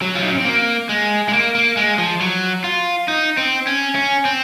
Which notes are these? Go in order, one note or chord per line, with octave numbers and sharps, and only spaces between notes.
F#3
F4
D#4
C#4
C4
A#3
G#3
G#3
A#3
A#3
G#3
F3
F#3
F4
D#4
C4
C#4
C#4
C4